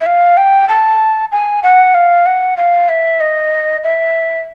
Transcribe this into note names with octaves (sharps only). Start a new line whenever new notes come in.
E5
F5
G5
A5
G#5
F#5
F5
F#5
F5
E5
D#5
E5